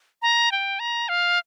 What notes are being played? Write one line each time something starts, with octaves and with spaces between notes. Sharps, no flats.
A#5
G5
A#5
F5